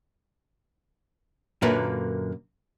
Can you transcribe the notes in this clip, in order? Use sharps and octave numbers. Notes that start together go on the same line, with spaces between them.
F#2 A#2 D3 A#3 B4